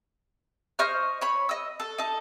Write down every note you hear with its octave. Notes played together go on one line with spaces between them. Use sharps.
C5 D#5 C#6 F6
C#5 B5
D#5 E6
A4
D#4 A4